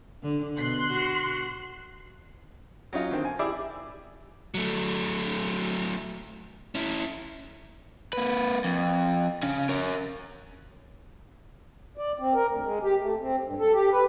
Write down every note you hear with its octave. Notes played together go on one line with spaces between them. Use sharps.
D3
B2 C6 F#6 C7
F#4
F#3 C#4 D#4 F4
D3 D#3 C4
G#5
E4 G4 G#4 D5 E5
F#3 A3
C#4 E4
A#3 B4
F2
C#3 C#4
A#4 C#5
D5
C4
A#4
D2
G#3
G4
A3
C4
G2
A4
G4
B4